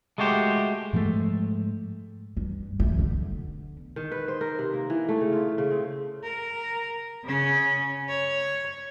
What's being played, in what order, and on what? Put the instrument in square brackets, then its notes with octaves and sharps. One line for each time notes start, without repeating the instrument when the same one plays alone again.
[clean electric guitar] G#3 A3 F#4 G4 C5
[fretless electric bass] G#2 F3 G#3 A3
[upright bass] G2
A3
D3 B3
[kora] D#3
B4
C5
A#4
C3
A#3
E3
A3
C#3
F4
C#3
C4
[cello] A#4
C#3 C#4
C#5